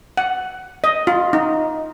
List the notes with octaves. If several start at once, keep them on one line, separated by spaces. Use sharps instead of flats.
F#5
D#5
F4
D#4